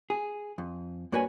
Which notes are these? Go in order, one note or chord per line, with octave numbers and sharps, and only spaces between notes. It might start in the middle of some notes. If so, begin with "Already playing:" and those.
G#4
F2
G2 A#3 F#4 B4 C#5 G#5